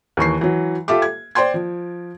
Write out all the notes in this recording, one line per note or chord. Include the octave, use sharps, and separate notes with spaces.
D#2 E3 C#6 C7
E3 F#3
F4 G4 A4 E5 D6
G#6
C5 D5 G5 C6 G#6
F3